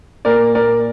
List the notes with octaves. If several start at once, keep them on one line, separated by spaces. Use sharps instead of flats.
A#2 A#4 D5
A#2 A#4 D5